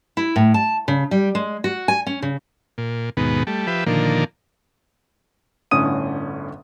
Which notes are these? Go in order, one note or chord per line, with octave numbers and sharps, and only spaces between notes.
E4
A2
A5
C#3
G3
G#3
F#4
G#5
C#4
C#3
A#2
D#2 G#2 B2 B3
G3 A3
F3 G4 B4 E5
A#2 D3 D#3 F3 A#3
G1 A2 D3 C#4 D#6 D#7